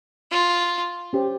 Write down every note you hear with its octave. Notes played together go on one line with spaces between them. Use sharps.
F4
C#4 G4 C5